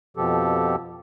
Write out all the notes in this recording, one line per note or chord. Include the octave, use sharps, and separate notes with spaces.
F2 B2 F3 G4 A4